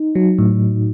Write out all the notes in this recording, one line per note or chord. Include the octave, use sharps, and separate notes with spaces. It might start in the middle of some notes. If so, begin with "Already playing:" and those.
Already playing: D#4
F#3
A2